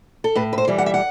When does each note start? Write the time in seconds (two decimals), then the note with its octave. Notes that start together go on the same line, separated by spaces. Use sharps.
0.24 A4
0.35 A2 B4
0.53 B4
0.58 C5
0.68 E3 G3
0.78 F#5
0.86 E5
0.94 F#5